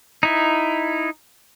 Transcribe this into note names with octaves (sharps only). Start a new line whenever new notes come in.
D#4 E4